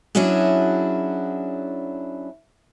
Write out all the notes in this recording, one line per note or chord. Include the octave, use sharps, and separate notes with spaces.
F#3 C#4 D4 E4 F#4 G#4